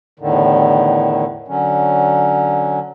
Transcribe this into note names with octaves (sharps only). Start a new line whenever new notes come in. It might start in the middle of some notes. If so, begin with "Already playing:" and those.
E2 A2 D3 D#3
D3 F#3 C#4